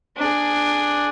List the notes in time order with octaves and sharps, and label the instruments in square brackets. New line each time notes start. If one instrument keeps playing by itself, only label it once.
[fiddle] D4 G#4